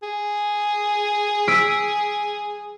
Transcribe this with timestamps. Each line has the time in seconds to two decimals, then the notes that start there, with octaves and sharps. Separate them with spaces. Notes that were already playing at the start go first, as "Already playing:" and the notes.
0.02 G#4
1.48 E6 B6 D7